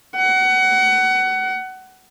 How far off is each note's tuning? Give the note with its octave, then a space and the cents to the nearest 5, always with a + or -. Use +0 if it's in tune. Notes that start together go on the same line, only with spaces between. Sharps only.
F#5 +25